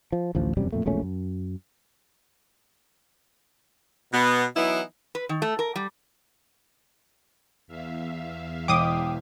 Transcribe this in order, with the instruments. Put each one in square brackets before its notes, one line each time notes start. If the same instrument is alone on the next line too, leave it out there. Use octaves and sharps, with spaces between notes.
[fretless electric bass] F3
A1 D2 F3
E1 F#2 C3 G3
F2 A#2 A3
E1 A#1 A3 C#4
F#2
[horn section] B2 B3
E3 F#3 B3 D#4 E4
[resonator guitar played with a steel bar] B4
D#3
A3
A#4
G3
[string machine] E2 E5 F5
[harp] E1 C7 [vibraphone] G5 [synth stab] D6 D#6